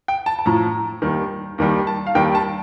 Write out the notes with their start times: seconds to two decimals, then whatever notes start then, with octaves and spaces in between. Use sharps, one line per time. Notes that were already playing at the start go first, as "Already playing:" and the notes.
0.08 G5
0.26 A5
0.39 A5
0.46 A2 F3 A#5
1.02 D#2 D#3 G3
1.58 D#2 D#3 G3
1.87 A5
2.07 F5
2.15 D#2 D#3 G3 G5
2.35 A5